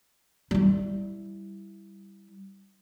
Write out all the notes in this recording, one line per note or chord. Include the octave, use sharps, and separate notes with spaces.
G3 E4